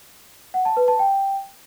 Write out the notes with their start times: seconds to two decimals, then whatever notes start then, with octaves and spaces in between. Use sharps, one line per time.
0.54 F#5
0.65 A5
0.77 B4
0.88 A5
0.99 G5